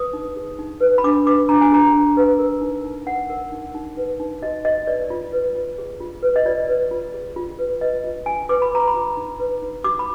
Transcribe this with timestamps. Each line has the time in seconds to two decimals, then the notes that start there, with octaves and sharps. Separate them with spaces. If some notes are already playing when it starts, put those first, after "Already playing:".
Already playing: B4 D#6
0.13 D#4
0.36 G#4
0.59 D#4
0.81 B4
0.98 B5
1.04 D4 D6
1.26 B4 D6
1.49 D4 A#5
1.61 G#5
1.72 G#4 A#5
1.94 D4
2.17 B4
2.39 A#4
2.61 D#4
2.85 D#4
3.07 A#4 F#5
3.30 A#4
3.52 D#4
3.75 D#4
3.97 B4
4.20 D#4
4.43 F#4 D#5
4.64 D#4 D#5
4.87 B4 D5
5.10 F4
5.33 B4
5.55 F4
5.78 G#4
6.01 F4
6.23 B4
6.36 D#5
6.46 F4 D5
6.69 B4
6.91 F4
7.14 G#4
7.36 F4
7.59 B4
7.81 B4 D#5
8.04 F4
8.26 F4 G#5
8.49 B4 D6
8.62 B5
8.71 B4 A#5
8.88 B5
8.94 F4
9.17 D#4
9.40 B4
9.62 D#4
9.84 F#4 D6
9.99 B5